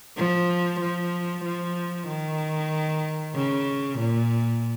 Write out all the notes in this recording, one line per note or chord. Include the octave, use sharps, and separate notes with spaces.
F3
F3
F3
D#3
C#3
A#2